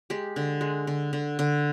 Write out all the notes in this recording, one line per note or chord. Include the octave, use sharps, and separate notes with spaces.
G#3 G4
D3
G#3
D3
D3
D3